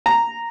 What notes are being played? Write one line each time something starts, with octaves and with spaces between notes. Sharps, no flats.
A#5